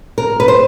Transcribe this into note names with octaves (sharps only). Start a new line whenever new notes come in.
A#4
B4
C5